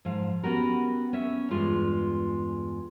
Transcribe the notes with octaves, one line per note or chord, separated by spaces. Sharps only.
G#2 F3 F5
B3 C#4 F#4 G4 A#4
C#4 C#5 E5
E2 G2 G#3 F4